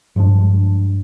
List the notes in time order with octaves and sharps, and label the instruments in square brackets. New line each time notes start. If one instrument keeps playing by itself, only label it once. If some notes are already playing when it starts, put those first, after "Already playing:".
[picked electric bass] G2 F3 G#3 D4